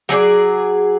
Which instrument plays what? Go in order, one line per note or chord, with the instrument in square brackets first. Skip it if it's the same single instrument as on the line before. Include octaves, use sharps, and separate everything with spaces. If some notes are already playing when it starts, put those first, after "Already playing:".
[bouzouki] F#3 G#4 C#5 D5